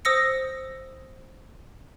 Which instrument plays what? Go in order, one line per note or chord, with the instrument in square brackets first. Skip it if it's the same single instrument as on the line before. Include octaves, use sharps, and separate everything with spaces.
[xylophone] C5 D#6 E6 A#6 C#7